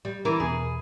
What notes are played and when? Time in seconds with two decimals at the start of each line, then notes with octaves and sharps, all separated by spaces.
0.05 G3
0.25 E3 A#4
0.40 E2 B2 G#4